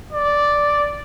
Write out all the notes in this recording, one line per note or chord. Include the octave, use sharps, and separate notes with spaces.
D5